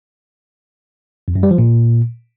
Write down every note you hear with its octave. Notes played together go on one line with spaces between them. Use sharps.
F2
F#2
G3
F3
A#2